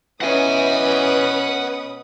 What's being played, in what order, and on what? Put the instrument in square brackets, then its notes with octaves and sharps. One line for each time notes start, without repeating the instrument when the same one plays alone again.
[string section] B2 B4 D#6 [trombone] E3 [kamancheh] C#4 D#5 [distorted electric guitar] F#5 G#5